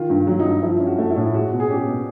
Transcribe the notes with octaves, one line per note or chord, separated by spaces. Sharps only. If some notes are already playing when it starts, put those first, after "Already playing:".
Already playing: D#3 F4
G2
F#3
D#4
G2
F3 E4
C#4
F#4
A3
E4
A2
G#3 F#4
B2
G#4
C#4 G4
B2